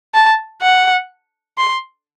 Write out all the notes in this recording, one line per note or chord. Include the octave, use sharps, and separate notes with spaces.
A5
F#5
C6